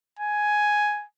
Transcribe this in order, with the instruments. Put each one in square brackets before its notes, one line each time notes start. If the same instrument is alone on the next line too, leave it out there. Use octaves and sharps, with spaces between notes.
[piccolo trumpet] G#5